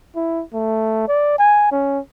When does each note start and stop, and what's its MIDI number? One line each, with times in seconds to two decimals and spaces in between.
0.16 0.43 64
0.54 1.08 57
1.08 1.36 74
1.39 1.70 80
1.72 1.99 61